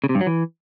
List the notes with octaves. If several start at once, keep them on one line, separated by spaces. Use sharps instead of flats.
C#3
C3
G2
F#3
E3